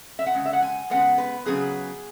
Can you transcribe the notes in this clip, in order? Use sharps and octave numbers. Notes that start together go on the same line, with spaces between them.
E5
F#5
C#3 G#3
E5
F#5
G#5
C#3 G#3 B3 F#5
B4
C#3 F#3 B3 G#4